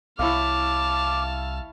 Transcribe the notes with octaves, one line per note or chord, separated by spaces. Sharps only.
C2 E4 C#5 F5 A5 D6 F6